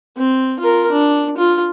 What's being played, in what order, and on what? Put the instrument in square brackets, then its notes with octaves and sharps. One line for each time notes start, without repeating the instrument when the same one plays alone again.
[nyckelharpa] C4
F4 A#4
D4
F4